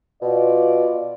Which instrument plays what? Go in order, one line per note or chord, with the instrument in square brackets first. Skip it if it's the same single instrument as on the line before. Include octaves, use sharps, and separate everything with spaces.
[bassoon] B2 [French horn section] F4 D5